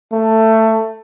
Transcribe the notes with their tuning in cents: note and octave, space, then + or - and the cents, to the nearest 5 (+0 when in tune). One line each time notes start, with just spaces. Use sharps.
A3 +15